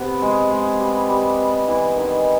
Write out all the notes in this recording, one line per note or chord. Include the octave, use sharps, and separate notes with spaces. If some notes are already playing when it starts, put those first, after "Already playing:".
Already playing: C3 B3
G#3
G#3
G3
G3
B3
E3
D#3